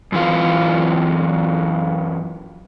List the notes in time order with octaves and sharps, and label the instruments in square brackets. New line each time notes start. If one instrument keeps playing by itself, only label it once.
[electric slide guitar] F#2 E3 F4